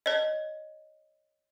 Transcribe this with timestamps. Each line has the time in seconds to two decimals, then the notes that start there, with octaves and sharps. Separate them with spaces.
0.06 C#5 D#5